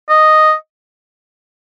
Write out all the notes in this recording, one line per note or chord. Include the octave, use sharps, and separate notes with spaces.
D#5